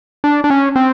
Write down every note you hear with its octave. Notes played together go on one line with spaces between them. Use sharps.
D4
D4
C#4
C4